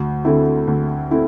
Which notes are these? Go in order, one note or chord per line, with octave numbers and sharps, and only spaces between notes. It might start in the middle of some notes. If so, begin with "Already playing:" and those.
Already playing: D2
D3 A3 C4 E4
D2
A3 C4 E4